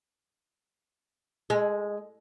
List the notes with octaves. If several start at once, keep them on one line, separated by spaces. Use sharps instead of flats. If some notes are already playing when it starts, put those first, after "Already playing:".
G#3